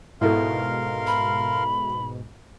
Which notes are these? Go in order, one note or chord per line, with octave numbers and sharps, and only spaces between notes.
G#2 B2 E4 A4 A#4 F5 C6
B5